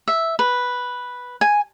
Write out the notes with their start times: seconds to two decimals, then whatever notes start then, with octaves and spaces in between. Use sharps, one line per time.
0.08 E5
0.39 B4
1.41 G#5